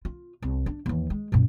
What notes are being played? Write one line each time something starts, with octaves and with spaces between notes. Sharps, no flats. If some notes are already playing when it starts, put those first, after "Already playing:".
F4
C2
D4
D#2 E3
G#3
F#2 A#2